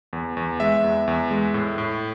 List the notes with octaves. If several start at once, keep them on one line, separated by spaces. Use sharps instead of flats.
E2
E2
G#3 E5
E2
E2
G#3
A2
A2